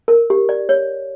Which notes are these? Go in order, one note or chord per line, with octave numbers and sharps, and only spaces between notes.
A#4
G4
D5
C#5